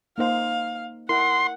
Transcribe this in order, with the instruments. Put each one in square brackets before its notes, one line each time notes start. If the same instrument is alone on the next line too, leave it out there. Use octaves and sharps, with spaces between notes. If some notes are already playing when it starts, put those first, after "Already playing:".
[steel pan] A#3 D#4 C5 [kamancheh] F5
[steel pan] E4 A#4 [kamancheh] F#5 [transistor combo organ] C6